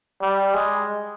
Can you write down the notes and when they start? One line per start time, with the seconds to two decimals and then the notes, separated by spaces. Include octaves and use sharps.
0.22 G3
0.54 G#3